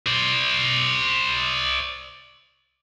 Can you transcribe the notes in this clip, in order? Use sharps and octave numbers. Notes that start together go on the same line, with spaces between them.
C5 D5